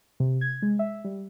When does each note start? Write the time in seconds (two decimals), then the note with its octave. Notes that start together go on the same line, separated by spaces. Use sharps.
0.20 C3
0.41 G#6
0.62 G#3
0.79 E5
1.04 G3